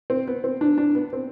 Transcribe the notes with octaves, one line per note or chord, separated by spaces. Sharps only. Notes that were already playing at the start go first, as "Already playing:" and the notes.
C4
B3
C4
D4
D4
B3
C4